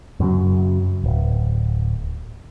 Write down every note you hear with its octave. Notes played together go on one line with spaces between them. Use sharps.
F#2 C#3 F#3
D1